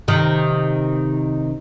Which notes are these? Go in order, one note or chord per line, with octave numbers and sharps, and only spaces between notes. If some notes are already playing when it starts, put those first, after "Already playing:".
C3 D#3